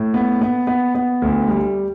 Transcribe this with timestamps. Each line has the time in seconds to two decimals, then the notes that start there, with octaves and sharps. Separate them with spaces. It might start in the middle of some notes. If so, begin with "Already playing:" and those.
Already playing: A2
0.14 B3
0.41 B3
0.67 B3
0.95 B3
1.22 D2
1.48 G3